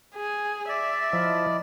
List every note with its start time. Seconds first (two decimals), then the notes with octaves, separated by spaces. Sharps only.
0.16 G#4
0.69 D5 E5
1.13 F3 E4 D#5